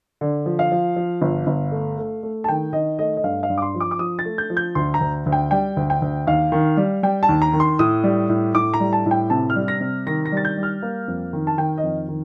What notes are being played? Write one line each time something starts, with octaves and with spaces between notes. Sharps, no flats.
D3
F3
F5
F3
F3
G1
G1
A3
A3
A3
A5
D#3 G5
D#3 D#5
A3 D#5
D#5
G2 F5
F5
G2
D6
C6
F3
D6
D6
F3 D#6
A6
A3
G6
F3
G6
D2 C6
A#5
D2
D2
G5
G3 G5
D2
G5
D2
D#2 F5
D#3
G3
G3 G5
A5
D#2
A#5
D#3
C6
A2 D#6
G3
A2
A2 D6
A#5
G3
A5
A2
G5
C3 A5
F6
G3
A#6
C3
D#3 A#6
A#6
G3 A6
G6
G3
F6
A#3
F2
D#3
A5
D#3 G5
D#5
F2
D#3